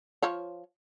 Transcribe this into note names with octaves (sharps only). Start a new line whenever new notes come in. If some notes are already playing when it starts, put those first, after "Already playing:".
F3 F4 C#5